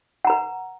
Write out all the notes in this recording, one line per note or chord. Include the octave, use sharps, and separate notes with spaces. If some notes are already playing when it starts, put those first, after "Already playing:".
B4 F#5 A#5